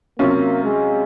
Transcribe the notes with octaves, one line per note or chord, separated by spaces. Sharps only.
C3 F#3 A#3 C#4 F4
G#3